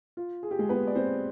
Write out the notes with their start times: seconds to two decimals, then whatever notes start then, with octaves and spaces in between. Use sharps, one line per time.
0.17 F4
0.43 G#4
0.51 G4
0.59 G#3 G#4
0.69 B3 B4
0.87 D5
0.95 C4 C5